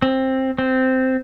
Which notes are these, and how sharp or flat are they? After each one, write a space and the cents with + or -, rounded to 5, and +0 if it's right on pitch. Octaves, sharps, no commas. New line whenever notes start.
C4 +15
C4 -10